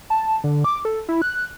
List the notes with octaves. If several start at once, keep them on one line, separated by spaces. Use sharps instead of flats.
A5
D3
D6
A4
E4
F#6